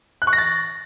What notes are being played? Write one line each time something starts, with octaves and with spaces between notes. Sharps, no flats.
F#6
C#6
A#6
A6